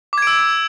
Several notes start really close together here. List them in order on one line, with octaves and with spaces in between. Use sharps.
D6 G#6 D7 E6